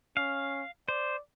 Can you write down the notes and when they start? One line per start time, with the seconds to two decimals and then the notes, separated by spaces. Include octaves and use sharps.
0.17 C#4 F5
0.88 C5 D5